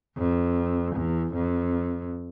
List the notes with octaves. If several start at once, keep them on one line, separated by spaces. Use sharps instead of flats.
F2
E2
F2